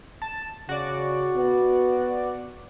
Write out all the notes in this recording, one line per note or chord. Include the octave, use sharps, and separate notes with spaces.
A5
C#3 F#4 D5
B3